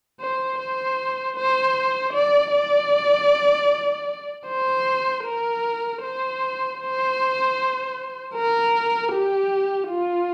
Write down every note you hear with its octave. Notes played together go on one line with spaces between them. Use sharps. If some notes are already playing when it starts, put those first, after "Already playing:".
C5
C5
C5
D5
D5
C5
A#4
C5
C5
A#4
G4
F4